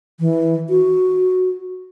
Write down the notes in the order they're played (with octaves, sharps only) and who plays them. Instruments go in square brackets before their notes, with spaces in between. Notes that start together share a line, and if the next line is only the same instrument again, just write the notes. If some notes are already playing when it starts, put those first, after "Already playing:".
[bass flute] E3
F#4